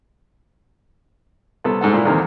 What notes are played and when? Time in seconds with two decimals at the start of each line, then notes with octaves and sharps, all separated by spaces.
1.64 C2 B3 A4
1.81 G#2 A4 F#5
1.93 A#2 A#3 E4
2.05 E2 D3 D#3 A#3 C4